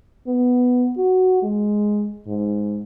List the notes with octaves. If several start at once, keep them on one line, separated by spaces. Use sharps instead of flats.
B3
F#4
G#3
G#2